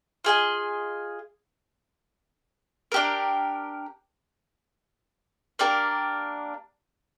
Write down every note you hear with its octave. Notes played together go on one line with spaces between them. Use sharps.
F4 G#4 D#5 G#5
D4 G4 A#4
A#3 D4 G4 A#4